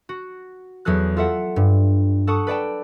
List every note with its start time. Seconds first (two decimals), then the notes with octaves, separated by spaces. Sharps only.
0.09 F#4
0.85 E2 F#3 G#4 A4 F#6
1.17 F4 A4 E5 F#5
1.56 G2
2.27 A4 F#5 A5 C#6 D#6
2.47 B4 D5 G5 A5